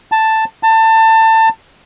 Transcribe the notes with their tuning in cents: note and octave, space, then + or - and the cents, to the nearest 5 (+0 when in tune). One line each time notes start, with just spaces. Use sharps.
A5 +5
A5 +25